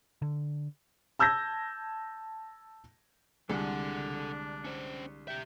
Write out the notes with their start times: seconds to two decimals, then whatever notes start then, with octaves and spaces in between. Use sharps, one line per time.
0.22 D3
1.19 A5 E6 G6 G#6 A#6
3.49 C2 D3 G#3 D4 A4 F#5
4.65 C#4 C5
5.28 G4 E5 G5